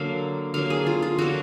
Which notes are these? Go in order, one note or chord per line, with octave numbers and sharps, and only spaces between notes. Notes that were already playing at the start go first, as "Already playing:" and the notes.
Already playing: D3 F#3 A#3 F5
D3 F#3 A#3 F5
G#4
F4
F4
D3 F#3 A#3 F#4